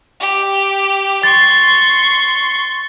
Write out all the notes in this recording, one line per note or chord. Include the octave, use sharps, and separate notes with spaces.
G4
C6 C#6 A6